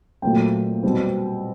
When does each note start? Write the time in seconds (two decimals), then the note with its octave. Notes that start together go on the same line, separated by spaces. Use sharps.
0.22 A#2 F#3 A3 C4 G5
0.83 B2 G3 C4